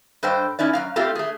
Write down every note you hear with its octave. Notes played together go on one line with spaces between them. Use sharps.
G2 A4 C5 D#5 G5
C#4 D#4 E4 D5
F#2 G#3 F5
A3 C4 F4 G4 A4
A3 G#4